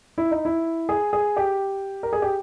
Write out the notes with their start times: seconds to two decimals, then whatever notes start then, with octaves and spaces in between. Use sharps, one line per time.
0.18 E4
0.31 D#4
0.45 E4
0.89 G#4
1.13 G#4
1.37 G4
2.03 A#4
2.13 G#4
2.22 G4